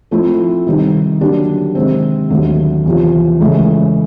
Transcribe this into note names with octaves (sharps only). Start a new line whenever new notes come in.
F3 A3 C4 E4
C3 D#3 G3 C4 D#4
D3 F#3 A#3 D4 G4
C3 D#3 G#3 C4
D#2 D3 F#3 A3
E2 C3 F3
C#2 C#3 E3 A3